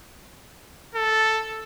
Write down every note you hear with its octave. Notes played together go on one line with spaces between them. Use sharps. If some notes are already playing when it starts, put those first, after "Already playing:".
A4